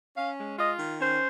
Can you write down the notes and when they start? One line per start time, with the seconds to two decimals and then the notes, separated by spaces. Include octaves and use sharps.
0.17 C#4 F5
0.38 G#3
0.59 F4 D#5
0.79 D#3
0.99 C#4 C5